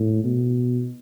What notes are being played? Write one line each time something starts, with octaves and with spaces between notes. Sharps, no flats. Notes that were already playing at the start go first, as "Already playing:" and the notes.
Already playing: A2
B2